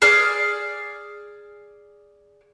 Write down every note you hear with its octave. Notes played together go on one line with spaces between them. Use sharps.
G#4 D5 F6